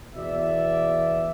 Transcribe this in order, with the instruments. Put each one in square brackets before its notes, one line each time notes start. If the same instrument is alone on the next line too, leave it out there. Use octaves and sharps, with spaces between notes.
[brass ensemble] E2 B2 D5 E5